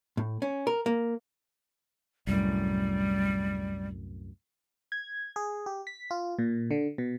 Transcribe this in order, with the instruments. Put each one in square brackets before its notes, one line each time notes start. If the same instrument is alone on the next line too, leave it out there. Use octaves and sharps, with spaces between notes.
[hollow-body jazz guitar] A2
C#4
A#4
A#3
[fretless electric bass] C2 F#2 A2 [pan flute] G3
[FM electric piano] G#6
G#4
G4
B6
F4
A#2
D3
B2